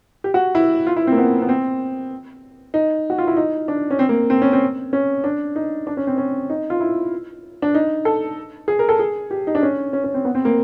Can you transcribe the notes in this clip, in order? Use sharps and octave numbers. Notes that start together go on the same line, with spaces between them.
G4
F#4
E4
F4
E4
C4
A#3
B3
B3
C4
D#4
F#4
F4
E4
D#4
D4
C#4
C4
A#3
C4
C#4
C4
C#4
D4
D#4
D4
C#4
C4
C#4
D#4
F4
E4
D4
D#4
A4
G#4
A#4
A4
G#4
G4
D#4
D4
C#4
C#4
C#4
C4
B3
C4
A#3